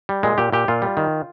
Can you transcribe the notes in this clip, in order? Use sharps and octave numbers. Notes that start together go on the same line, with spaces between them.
G3
A#2 G#3
A#2 G4
A#2 G4
A#2 F4
G3
D#3